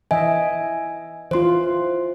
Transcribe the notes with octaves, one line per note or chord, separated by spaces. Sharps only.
E3 D#5 E5 G#5
E3 F4 C5 C6